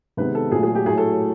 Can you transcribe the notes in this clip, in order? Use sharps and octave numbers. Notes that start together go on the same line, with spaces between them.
C3 D#3 G#3 B3 B4
A4
A#2 F#3 A3 G#4
G#4
G4
A2 F#3 A3 G#4
A4